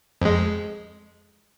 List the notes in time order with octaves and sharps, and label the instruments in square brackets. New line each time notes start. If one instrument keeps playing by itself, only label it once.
[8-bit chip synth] F2 G#3